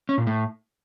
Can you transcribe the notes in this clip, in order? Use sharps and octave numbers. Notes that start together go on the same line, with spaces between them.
C#4
A#2
A2